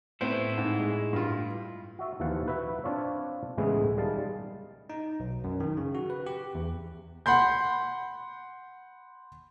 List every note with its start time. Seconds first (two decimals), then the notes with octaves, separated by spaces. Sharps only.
0.21 A2 B3 C4 E4 C5
0.58 G#2
0.80 G#3
1.13 G2 F4
1.99 F#4 E5
2.20 D#2 E3 F3 F5 F#5 A5
2.46 F#4 B4 E5
2.84 C4 D4 F4 C#5
3.57 C#2 A2 E3 G#3 B3 G#4
3.97 D#3 G3 G#3 F5 A5
4.90 D#4
5.20 B1
5.44 F#2
5.60 D#3
5.77 C#3
5.95 F#4
6.10 B4
6.26 G4
6.55 E2
7.26 F#5 B5 C6 G6